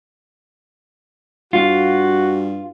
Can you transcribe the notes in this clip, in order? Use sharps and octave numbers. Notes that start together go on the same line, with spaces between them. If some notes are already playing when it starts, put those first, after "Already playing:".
G2 F4 F#4